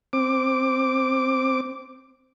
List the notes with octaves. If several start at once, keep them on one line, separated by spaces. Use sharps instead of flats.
C4 D6